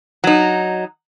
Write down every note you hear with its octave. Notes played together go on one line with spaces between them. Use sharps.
F#3 D#4